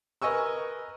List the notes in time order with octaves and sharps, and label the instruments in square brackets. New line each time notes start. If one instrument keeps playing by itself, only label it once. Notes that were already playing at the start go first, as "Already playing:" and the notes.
[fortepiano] A#4 B4 D#5 G#5 C#6 E6